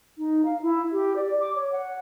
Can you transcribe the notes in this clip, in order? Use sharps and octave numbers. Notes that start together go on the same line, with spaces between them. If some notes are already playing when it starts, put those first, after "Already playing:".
D#4
F5
E4
G4
D5
D6
C#5
F#5